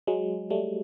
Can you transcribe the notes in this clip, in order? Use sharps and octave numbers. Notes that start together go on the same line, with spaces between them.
F#3 G#3
G3 A3